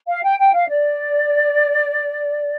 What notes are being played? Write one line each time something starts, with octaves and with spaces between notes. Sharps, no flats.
F5
G5
G5
F5
D5